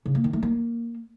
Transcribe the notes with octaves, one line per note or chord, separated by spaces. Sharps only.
C#3
A#3
D#3
A3
A#3